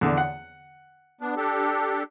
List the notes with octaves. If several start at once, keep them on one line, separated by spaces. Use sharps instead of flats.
E2 D3
F#5
B3 D4
D4 G4 A4